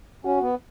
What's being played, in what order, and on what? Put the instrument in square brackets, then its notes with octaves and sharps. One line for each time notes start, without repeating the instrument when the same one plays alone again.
[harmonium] C#4 [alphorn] F#4
[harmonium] B3